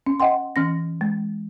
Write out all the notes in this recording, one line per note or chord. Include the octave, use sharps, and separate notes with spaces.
C#4
D#5 F#5 G5 C6
E3 C#4 A#6
G#3